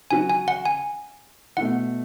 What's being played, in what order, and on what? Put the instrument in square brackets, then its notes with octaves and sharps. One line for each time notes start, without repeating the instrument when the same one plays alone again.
[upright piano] C#3 F#3 C#4 F#4 [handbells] G#5
[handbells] G#5
F#5
G#5
[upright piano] B2 A3 E4 [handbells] F#5